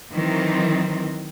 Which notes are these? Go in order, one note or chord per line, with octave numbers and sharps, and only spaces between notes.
D#3 E3 F#3 C4